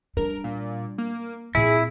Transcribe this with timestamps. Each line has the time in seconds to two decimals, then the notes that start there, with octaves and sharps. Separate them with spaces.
0.17 G3 D4 A#4
0.44 A#2
0.98 A#3
1.55 A#2 C4 E4 G#4